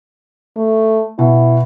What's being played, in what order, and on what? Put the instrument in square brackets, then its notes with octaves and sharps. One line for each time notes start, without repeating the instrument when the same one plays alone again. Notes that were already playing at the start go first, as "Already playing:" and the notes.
[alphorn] A3
[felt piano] B2 [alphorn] E4